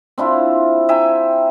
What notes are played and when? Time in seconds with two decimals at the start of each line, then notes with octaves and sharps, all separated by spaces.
0.18 C4 D4 E4 F4
0.89 E5 G5 G#5 A#5